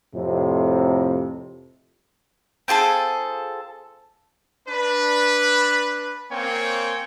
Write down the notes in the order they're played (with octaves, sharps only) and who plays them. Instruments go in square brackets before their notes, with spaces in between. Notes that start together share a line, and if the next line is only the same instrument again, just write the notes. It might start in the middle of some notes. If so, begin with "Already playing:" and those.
[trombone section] F2 A2 C3
[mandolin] C4 F4 G#4 A4
[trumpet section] D4 B4
A#3 C4 C#5 G5 G#5